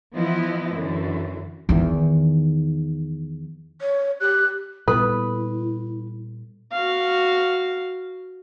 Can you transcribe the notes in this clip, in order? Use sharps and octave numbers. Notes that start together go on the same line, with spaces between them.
E3 F3 B3 E4 D#5
F#2 D3 E3
E2 D#3
C#5
G4 F#6
A#2 G3 B3 E4 A4 B4
F#4 F5